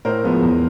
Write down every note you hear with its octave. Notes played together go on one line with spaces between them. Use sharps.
A2 A#4 C5
F3 G#3 B3
E2